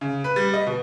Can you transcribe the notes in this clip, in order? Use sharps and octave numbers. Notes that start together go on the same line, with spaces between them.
C#3
B4
G3
D#5
B2